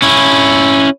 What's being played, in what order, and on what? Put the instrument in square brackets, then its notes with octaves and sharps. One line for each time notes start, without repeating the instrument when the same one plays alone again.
[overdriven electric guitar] C#4 E4